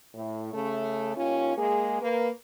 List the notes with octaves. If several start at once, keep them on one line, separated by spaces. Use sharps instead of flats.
A2
C#3 A3
D#2 C#4 F4
G#3 A#3 G#4
A#3 B4